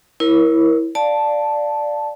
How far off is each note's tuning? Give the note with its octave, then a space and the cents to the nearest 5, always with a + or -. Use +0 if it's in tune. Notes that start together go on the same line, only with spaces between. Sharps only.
E4 -5 A#4 +15 C#5 -35
D5 +0 F5 +0 A5 +0